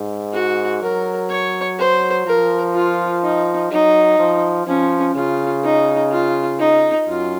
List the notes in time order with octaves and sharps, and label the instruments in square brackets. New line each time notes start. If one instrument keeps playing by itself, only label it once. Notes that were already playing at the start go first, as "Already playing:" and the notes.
Already playing: [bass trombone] G#2
[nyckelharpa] F#4
[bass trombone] F#3 [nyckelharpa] A#4
[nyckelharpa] C#5
C5
[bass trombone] F3 [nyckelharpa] A#4
[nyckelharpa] F4
D#4
[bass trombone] F#3 [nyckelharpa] D#4
[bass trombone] F3
[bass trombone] F3 [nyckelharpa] C#4
[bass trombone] C#3 [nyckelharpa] F4
[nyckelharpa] D#4
F4
D#4
[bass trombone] F#2 [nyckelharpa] F4